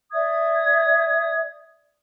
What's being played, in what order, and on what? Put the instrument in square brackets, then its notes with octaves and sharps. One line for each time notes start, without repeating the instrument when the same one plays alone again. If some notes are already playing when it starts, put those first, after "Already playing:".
[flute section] D5 E5 D#6 G#6